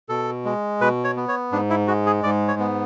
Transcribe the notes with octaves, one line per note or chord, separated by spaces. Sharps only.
B2 A4
G#3
B2 B4
C#5
B3
C#5
G#2 D4
E4
G#3 F#4
G#4
G#2 D5
C#5
B3